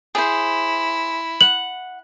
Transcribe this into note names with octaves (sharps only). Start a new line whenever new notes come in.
E4 G#4 C5
F#5 F#7